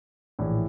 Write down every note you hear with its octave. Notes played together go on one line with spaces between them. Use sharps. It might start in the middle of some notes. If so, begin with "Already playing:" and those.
A#1 A2 E3